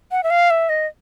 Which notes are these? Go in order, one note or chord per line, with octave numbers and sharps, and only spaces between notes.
F#5
E5
F5
E5
D#5